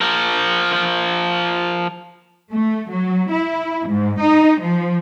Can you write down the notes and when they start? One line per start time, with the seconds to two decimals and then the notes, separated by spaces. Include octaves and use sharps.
0.01 F3 A#4
2.51 A3
2.89 F#3
3.31 E4
3.87 G#2
4.20 D#4
4.60 F3